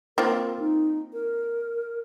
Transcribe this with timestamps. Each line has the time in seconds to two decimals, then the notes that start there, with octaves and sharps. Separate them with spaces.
0.18 A#3 C4 F4 A#4
0.59 D#4
1.14 A#4